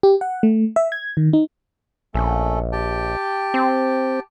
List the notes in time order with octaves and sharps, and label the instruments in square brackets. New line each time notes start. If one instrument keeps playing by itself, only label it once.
[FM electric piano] G4
F#5
A3
E5
G#6
D#3
D#4
[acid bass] A#1 [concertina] A3 C#4 A4
[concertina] G4 G5 A5
[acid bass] C4